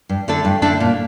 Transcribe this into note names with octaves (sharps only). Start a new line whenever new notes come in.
G2
D3 A3 D4 A4
G2
D3 A3 D4 A4
A#2